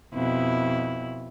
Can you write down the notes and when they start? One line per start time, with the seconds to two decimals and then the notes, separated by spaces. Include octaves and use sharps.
0.14 F2 B2 E4